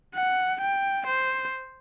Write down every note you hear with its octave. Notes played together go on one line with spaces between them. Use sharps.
F#5
G5
C5